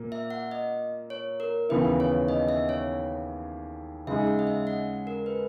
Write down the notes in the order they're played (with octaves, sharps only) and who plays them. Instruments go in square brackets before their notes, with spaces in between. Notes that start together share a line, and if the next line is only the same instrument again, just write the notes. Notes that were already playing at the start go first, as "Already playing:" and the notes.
Already playing: [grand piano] A#2 A#3
[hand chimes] E5
F#5
D#5
C#5
A#4
[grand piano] D#2 C#3 E3 B3 E4 [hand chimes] B4
[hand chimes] C#5
D#5
E5
C#5
[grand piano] C#3 G#3 D#4 G#4 [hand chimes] E5
[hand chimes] F#5
D#5
E5
F#5
A#4
B4